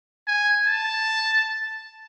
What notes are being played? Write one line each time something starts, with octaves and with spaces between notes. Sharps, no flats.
G#5
A5